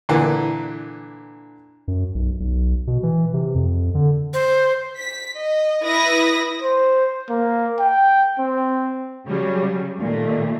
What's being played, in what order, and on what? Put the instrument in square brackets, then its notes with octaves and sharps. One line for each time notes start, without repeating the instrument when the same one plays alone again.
[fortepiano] A#2 D3 E3
[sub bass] F#2
B1
B1
B2
E3
C3
F2
D3
[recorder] C5
[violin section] B6
D#5
E4 B4 D#6 A#6
[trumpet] C5
A#3
G5
C4
[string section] C#3 F#3 G3
A#2 D#3 A3